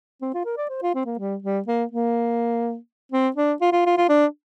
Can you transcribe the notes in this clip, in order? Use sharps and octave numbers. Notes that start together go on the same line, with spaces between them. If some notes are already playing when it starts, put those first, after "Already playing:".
C4
F4
A#4
D5
C5
F4
C4
A#3
G3
G3
A#3
A#3
C4
D4
F4
F4
F4
F4
D4